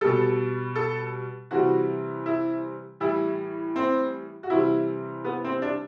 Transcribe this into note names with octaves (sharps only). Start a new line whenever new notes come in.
B2 G3 A4
A4
C3 E3 G3 F#4
E4
A2 E3 G3 E4
C4
F#4
C3 E3 G3 E4
B3
C4
D4